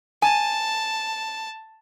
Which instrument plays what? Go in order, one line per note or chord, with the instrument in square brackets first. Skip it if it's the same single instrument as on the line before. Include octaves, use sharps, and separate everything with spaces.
[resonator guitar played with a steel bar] G#5 [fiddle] A5